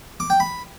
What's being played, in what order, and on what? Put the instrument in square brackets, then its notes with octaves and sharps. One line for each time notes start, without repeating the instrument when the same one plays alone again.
[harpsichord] D6
G5
B5